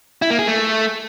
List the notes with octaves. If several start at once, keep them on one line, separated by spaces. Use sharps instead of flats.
E4
A#3
G#4
A3